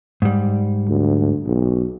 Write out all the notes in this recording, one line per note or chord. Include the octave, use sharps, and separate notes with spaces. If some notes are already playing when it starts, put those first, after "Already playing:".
G#2 G3
D2
B1